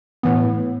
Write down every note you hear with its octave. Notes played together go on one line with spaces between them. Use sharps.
A2 E3 B3